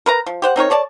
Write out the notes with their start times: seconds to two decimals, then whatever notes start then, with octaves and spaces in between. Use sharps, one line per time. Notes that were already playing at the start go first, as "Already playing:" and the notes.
0.06 A#4 B4 A#5
0.26 F3
0.42 G4 C5 F#5
0.56 C4 D#4 A#4 C#5
0.70 A4 C#5 D5 A5